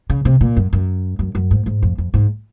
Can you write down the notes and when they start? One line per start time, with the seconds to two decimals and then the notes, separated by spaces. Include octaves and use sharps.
0.10 C#3
0.25 C3
0.41 A#2
0.56 F#2
0.73 F#2
1.19 F#2
1.35 F#2
1.51 G#2
1.66 G#2
1.82 F2
1.98 F2
2.14 G#2